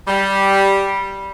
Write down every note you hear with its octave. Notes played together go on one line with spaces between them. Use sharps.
G3